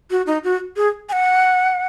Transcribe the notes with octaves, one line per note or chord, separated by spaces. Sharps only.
F#4
D#4
F#4
G#4
G#5
F#5